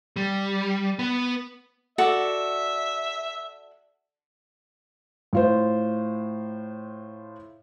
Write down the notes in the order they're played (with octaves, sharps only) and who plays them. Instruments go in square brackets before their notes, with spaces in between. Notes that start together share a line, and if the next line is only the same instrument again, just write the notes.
[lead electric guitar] G3
B3
[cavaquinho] F#4 A4 D5 [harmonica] E5
[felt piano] A2 F4 C5